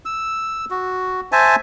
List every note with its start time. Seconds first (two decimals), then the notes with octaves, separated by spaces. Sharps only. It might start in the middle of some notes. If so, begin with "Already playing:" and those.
0.05 E6
0.70 F#4
1.32 C5 E5 G#5 A5